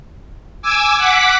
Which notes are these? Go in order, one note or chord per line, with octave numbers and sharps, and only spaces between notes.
G#5 D6 E6
F#5 D6 B6